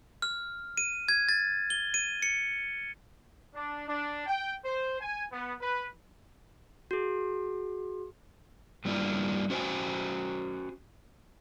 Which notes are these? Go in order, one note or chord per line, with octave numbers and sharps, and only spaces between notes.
F6
D#7
G#6
A6
G7
D#7
C#7
D4
D4
G5
C5
G#5
B3
B4
F#4 G#4
G2 G3 A#3 D4 E4 F4
C#4 F#4 C5 D5 G5 G#5